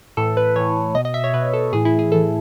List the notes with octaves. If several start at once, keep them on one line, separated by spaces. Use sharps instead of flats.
A2 E3 A4
B4
A2 E3 C#5
B2 D#5
D#5
E5
C#5
B2 B4
A4
A2 E3 G#4
E4
G#4
A2 E3 A4